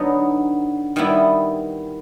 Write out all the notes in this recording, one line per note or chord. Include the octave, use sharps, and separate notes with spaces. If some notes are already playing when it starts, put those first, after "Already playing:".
Already playing: D3 F#3 B3 D#4
D#3 G3 B3 E4